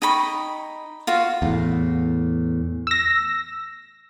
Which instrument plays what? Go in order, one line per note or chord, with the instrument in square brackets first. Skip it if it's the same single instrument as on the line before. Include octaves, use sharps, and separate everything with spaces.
[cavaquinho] D#4 G5 B5 C#6
F4 F#4 F5
[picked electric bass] E2 A2
[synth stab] E6 A#6